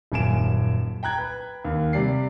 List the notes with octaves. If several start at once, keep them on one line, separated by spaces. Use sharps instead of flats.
D#1 F#2 G#5 D7 E7
G5 A#5 F#6 G#6
B4
D#2
C3 G3 D5 C7